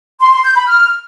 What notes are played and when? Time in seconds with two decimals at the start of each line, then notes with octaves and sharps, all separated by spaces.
0.20 C6
0.32 C6
0.44 G6
0.55 B5
0.67 F6